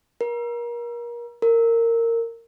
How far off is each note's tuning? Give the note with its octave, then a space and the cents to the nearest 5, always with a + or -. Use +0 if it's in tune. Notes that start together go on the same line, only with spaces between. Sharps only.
A#4 +30
A#4 -20